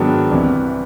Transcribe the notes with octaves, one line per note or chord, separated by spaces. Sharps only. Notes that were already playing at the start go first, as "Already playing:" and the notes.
Already playing: G#2 D#3 F#3 B3 D4
C2 C3 E3